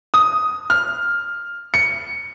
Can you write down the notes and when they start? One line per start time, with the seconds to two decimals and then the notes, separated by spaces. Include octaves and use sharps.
0.14 D#6
0.70 F6
1.74 C#7